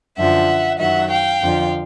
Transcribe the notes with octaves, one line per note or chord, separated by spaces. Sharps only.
F#2 D3 F3 E5 F#5
F#2 D#3 F#3 E5 F#5
F5 G5
F2 D3 F3